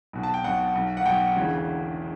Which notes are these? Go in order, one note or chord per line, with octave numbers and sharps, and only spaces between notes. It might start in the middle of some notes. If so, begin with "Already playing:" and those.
B1 B2
A5
G5
B1 B2 F#5
B1 B2
F#5
B1 B2 G5
E1 D2 C#3 E3